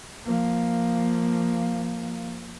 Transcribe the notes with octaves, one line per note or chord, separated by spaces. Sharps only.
F3 A#3